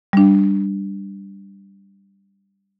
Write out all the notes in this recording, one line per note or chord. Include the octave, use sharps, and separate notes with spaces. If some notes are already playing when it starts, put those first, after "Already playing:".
G3 D4